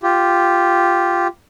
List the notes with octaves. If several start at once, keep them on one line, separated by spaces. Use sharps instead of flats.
F4 G4